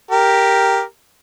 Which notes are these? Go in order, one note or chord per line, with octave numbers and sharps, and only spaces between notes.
G4 A#4